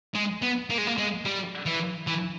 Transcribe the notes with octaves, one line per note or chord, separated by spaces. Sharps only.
G#3
B3
A#3
G#3
A#3
G#3
G3
E3
E3